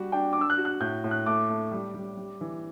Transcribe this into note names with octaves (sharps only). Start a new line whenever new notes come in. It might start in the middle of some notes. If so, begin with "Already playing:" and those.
Already playing: G3 F#4
D4 G5
D4 D6
E6
F#6
F#4
F#6
A2 G6
A2
F#6
A3 D6
A3
G3
G3
G3
E3